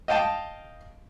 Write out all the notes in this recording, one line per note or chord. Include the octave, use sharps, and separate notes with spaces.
D#5 F5 G5 A5